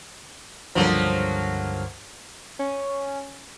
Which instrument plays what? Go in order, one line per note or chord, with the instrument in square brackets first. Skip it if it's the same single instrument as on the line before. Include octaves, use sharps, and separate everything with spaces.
[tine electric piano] C#2 G2 D3 [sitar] F3 F#3 A#3
[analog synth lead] C#4